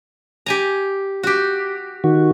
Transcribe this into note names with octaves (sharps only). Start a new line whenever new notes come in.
G4 G#5 A#5
F#4 G4
D#3 F#4